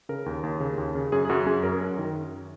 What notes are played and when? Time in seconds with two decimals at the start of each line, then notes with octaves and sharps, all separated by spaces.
0.09 C#3 A#4
0.26 D#2
0.43 D#2
0.60 C#3
0.78 D#2
0.95 C#3
1.12 F#2 G#4
1.25 G#4
1.29 F#2 F#4
1.47 F#2 G#4
1.63 F#2 A#4
1.81 F#2 A#4
1.98 D#3 A#4